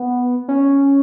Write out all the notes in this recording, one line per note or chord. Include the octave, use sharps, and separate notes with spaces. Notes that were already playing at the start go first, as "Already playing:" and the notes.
Already playing: B3
C#4